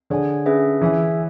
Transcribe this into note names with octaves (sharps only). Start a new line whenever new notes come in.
D3 G#4 C#5 G#5
C#4 G#4 B4 E5
E3 G#4 C#5 E5 G#5